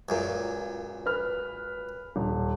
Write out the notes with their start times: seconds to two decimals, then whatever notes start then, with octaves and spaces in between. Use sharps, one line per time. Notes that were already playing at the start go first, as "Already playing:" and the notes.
0.09 C#2 F#2 A#2
1.06 B4 F6
2.16 D#1